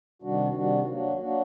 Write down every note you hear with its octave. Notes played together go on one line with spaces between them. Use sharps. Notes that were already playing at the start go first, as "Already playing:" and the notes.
C3 D#3 G3 D4 F#4
C3 D#3 G3 D4 F#4
F#3 A#3 D4 F#4
F#3 A#3 D4 F#4